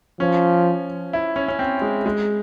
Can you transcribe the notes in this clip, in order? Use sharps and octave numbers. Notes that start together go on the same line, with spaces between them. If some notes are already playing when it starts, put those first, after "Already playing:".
F3 C#4
E4
C#4
C#4
C4
G#3
G#3